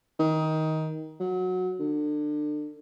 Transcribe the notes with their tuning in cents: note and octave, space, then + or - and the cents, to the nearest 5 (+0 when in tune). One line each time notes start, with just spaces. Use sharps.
D#3 +15
F#3 -15
D3 +30